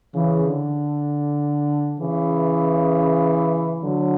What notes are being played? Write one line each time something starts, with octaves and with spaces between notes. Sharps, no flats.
C#3 E3
D3
C#3 E3
D3 F#3